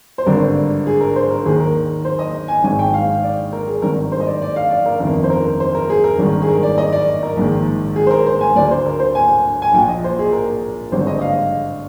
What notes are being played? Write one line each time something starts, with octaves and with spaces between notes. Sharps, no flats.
C5
G#1 G2 D3 A#4
G#4
A#4
C5
A#4
D#2 D#3 G#4
A#4
C5
D#5
G#5
G#1 G#2 D#3 G#5
G5
F5
D5
A#4
G#4
G#1 G2 D#3 A#4
C5
D#5
D5
D5
F5
D5
A#4
G1 F2 D#3 A#4
C5
A#4
A#4
C5
A#4
G#4
A#4
G#1 G2 D#3
G#4
A#4
D5
D#5
D5
A#4
A#1 G#2 D#3
G#4
C5
A#4
C5
G#5
D2 D3 D5
C5
A#4
C5
G#5
G#5
A#1 A#2 G5
D#5
C5
G#4
A#4
G#1 G2 D3 C5
D#5
D#5
F5